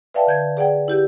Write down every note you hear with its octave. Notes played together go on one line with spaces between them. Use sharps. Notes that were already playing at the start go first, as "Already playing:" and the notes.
B4 D5 E5 F5 G5 A5
D3 G6 G#6
G#4 D5 F#5 G5
E4 G4 G6